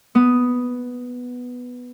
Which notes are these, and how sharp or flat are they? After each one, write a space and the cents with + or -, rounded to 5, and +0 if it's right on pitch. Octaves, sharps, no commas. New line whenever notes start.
B3 +0 D#6 +0